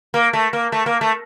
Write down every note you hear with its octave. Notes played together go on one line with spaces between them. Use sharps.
A#3
A3
A#3
A3
A#3
A3